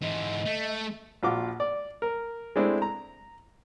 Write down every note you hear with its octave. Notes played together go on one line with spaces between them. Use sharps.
G#2 E3 D#5
A3
A#1 F4 F#4 D6
D5
A#4
G#3 A3 C4 D4 E4
A#5